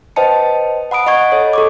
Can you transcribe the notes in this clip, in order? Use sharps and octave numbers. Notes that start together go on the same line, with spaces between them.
B4 C5 D#5 G5 A5 C#7
F#5 B5 D#6 D7
D#5 F#5 C#6 G#6
A4 C#5 D#5
A4 C#6 D6